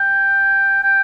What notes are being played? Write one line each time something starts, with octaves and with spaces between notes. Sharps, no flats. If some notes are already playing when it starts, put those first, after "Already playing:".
Already playing: G5
G5